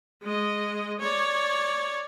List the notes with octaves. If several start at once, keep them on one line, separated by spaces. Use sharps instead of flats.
G#3 D#5
C#5 D5